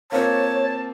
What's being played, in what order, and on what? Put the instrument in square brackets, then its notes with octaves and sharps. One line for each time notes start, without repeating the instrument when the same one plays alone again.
[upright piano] A#3 C4 F4 [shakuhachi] C#5 [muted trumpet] A5